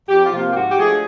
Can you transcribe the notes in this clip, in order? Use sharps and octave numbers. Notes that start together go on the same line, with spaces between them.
F2 G4
F4
C3 F3 A#3
F4
G4
G#2 F#4
G4
F3 A3 D4 G#4